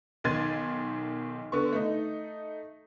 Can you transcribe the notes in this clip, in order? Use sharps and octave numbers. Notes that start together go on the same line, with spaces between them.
B1 D#3 C6 G#6 A6 D#7
D3 B3 C#6
A3 D#4